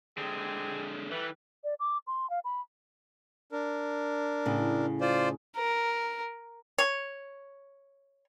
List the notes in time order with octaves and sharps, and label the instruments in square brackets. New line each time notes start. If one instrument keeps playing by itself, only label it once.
[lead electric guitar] D3 G#3 [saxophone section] C4 G4 G#4
[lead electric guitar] E3 [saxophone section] G3 A3 B4
[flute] D5
D6
C6
F5
B5
[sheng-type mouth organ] D4 A#4
[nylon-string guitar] A2 C#3
[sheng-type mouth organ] F4 C5 D5
[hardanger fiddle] A#4
[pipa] C#5